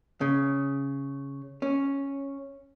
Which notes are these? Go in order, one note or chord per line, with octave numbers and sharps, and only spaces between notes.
C#3
C#4